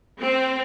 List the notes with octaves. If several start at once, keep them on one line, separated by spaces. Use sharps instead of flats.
C4